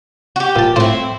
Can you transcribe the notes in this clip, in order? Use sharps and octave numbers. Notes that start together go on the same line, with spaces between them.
F#4 G4
A#2 A5
A2 C4 E4